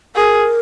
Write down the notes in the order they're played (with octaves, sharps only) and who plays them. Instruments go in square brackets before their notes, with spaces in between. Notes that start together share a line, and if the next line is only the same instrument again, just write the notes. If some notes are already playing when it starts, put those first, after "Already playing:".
[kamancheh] G#4 [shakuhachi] A#4